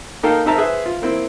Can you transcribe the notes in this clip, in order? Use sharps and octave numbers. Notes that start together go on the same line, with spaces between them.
A#3 D#4 A4 A#4 F5 G5
C4 D#4 A#4 E5 A5 A#5
G#4 B4 C5 E5
F4
A#3 C4 E4